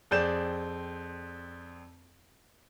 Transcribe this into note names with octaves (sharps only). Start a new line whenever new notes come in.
F2 C4 G#4 D5 G6 E7